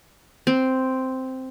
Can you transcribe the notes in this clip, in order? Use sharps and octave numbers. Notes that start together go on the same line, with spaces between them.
C4